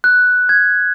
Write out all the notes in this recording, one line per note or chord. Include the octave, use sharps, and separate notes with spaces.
F#6
G#6